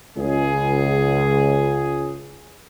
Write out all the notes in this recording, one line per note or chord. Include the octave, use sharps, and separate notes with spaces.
C#2 G#4